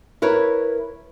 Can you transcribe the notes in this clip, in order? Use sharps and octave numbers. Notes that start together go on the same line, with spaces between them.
E4 A#4 B4 C#5